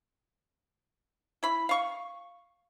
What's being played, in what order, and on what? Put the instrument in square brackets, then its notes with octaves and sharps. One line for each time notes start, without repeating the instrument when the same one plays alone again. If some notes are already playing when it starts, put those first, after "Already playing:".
[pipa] E4 B5
F5 C#6